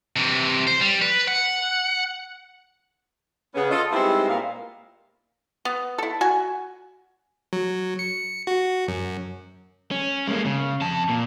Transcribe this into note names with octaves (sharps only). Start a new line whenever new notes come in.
C3 E3
C5
G3
B4
F#5
C#3 B3 C#4
F4 A4 D#5
G3 G#3 B3 C4 D#4 E4
A#2 F5
B3
E4 A4
F#4 G#5
F#3
C#7
F#4
F#2
C#4
G#3 A#3
C#3
F2 A5
A#2